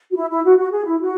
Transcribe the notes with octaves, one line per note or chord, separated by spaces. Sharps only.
F#4
E4
E4
F#4
F#4
G#4
E4
F#4